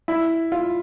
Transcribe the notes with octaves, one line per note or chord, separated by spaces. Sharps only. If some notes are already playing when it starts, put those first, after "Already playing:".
E4
F4